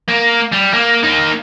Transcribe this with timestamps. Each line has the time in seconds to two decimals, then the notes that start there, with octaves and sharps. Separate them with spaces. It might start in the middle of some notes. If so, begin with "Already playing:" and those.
0.08 A#3
0.53 G3
0.74 A#3
1.04 A#3 D#4